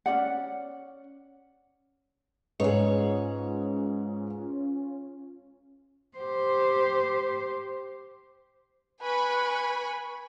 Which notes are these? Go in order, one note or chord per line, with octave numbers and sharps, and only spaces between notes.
C#4 F#4 D5 F#5
G#2 C#4 F4 G#4 B4 C#5 D#5
G4 C5
B4 G#5 B5 C#6